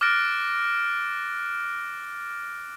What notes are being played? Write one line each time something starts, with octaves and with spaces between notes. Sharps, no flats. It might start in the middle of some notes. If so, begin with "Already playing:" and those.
D6 F6 F#6 A6 A#6 D7